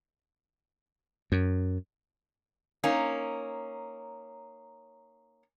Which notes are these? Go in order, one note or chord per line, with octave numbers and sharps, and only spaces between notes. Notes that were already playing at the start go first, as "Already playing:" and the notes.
F#2
A#3 C#4 D#4